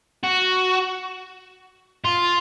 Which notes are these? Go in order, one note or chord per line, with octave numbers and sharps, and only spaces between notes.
F#4
F4